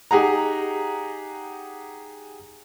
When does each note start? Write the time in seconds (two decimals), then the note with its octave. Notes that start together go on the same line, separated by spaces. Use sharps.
0.11 D#4 G4 G#4 F#5 A#5